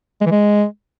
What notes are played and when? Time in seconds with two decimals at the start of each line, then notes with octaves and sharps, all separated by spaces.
0.21 G#3
0.26 E3
0.31 G#3